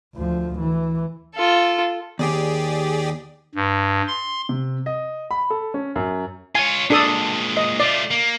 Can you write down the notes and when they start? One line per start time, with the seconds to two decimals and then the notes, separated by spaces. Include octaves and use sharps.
0.15 D2 F3
0.60 E3
1.36 F4 A4
2.19 D#2 G4 G#4 D5
3.55 G2
4.07 C6
4.49 C3
4.86 D#5
5.31 B5
5.50 A4
5.74 C#4
5.96 F#2
6.55 F4 C#5 G#5
6.90 A#2 G#3 D4 A4 D#6
7.57 D#5
7.80 A3 F4 D5
8.11 A#3